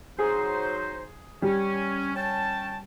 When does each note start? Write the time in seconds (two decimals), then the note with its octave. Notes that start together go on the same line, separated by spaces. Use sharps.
0.19 F#3 D#4 G#4 C5
1.42 G3 C#4
2.16 C#4 G5 A5